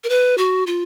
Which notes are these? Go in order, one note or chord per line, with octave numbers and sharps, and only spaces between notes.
A#4
B4
F#4
F4